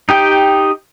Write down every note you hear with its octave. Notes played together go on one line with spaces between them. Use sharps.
D#4 G4 G5